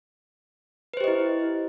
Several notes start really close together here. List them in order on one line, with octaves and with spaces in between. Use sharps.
B4 C5 G4 D#5 E4